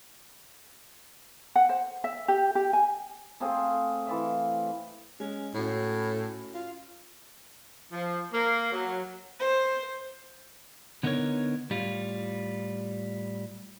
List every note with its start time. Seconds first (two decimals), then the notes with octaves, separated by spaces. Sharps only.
1.55 F#5
1.69 C5
2.04 E5
2.28 G4
2.55 G4
2.73 G#5
3.40 A3 C4 F4 G#4
4.07 E3 F4 E5
5.20 G#3 C#4
5.54 A2 C#4 F#4
6.54 F4
7.92 F3
8.33 A#3
8.73 F#3
9.38 C5
11.03 D3 B3 D#4 E4 A#4 C#5
11.70 A2 G3 F4